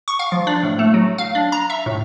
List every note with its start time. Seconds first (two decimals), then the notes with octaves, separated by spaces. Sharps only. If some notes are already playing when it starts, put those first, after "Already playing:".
0.08 C#6
0.19 F5
0.32 F3
0.47 D4
0.63 A2
0.79 A3
0.94 F#3
1.18 F5
1.35 D4
1.52 A#5
1.70 E5
1.86 A2